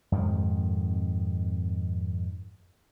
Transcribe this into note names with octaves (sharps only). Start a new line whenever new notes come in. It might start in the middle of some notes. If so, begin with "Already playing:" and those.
F2 G#2 C3 D#3